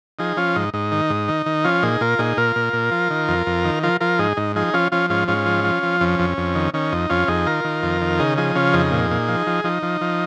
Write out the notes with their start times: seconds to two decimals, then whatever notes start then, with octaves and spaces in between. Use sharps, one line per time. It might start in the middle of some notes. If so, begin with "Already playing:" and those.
0.19 F3 D#4 G#4
0.37 F3 C#4 F4
0.56 G#2 D#4
0.74 G#2 D#4
0.92 D#3
1.10 G#2
1.28 D#3
1.46 D#3
1.64 F3 C#4 F4
1.82 A#2 D#4 G#4
2.01 A#2 F4 A#4
2.19 A#2 D#4 G#4
2.37 A#2 F4 A#4
2.56 A#2
2.73 A#2
2.91 F3
3.10 D#3
3.28 F2
3.46 F2
3.65 D#3
3.83 F3 F4 A#4
4.00 F3 F4 A#4
4.19 G#2 D#4 G#4
4.37 G#2 D#4
4.55 F3 D#4 G#4
4.73 F3 C#4 F4
4.92 F3 C#4 F4
5.10 G#2 C#4 F4
5.28 G#2 C#4 F4
5.46 F3
5.64 F3
5.83 F3
6.01 F2 C#4
6.19 F2
6.37 F2
6.55 D#3
6.74 D#3 C#4
6.92 F2 D#4
7.10 F2 C#4 F4
7.28 F2 D#4 G#4
7.46 D#3 F4 A#4
7.64 D#3
7.83 F2
8.01 D#3
8.19 C#3 D#4 G#4
8.37 F3 D#4 G#4
8.56 C#3 C#4 F4
8.73 F2 D#4 G#4
8.92 A#2
9.11 A#2
9.29 F3
9.47 F3
9.64 F3 D#4
9.83 F3
10.01 F3